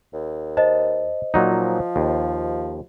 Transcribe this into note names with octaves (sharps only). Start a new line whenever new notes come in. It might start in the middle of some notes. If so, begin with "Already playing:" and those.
D#2
C5 D#5 A5
A#2 F#3 D#4
F3
D#2